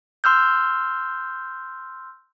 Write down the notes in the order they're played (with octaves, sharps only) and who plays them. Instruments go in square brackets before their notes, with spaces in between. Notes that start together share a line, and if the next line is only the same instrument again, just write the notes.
[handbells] C6 E6 F6 G6